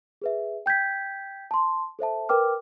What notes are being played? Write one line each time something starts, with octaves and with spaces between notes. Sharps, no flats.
G#4 B4 E5
G5 G6 G#6 B6
A5 C6
A4 C5 E5 A5
A#4 B4 G5 D6 F6